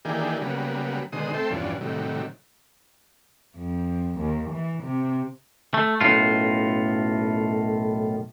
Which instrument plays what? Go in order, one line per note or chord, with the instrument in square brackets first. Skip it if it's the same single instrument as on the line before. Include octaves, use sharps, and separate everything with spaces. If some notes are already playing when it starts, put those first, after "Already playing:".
[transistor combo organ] D#3 E3 A#3 D4 G4 G#4
C#3 F#3 G3 A#3 B3
B2 D3 D#3 G#3 C5 D#6
A3 C4 A4 C5 E5 G5
E2 G2 B2 F3 C#4 D4
A2 C3 D#3 F#3 G3
[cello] F2
D#2
E3
C3
[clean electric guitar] A3
B1 F#2 A2 F4